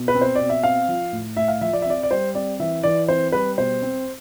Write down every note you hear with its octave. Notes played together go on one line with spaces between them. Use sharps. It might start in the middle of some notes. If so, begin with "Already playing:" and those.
Already playing: B2
B4
C4
C5
B2 D5
E5
C4 F5
F3
A2
A2 E5
F5
F3 E5
D5
E5
C4 D5
D5
G3 C5
C4 D5
E3 E5
E3 D5
C4 C5
G3 B4
B2 C5
C4